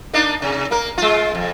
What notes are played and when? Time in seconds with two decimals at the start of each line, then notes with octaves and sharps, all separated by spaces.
0.13 A#3 D4 D#4
0.42 C3
0.71 A#3 A#4
0.98 G#3 F4
1.35 F2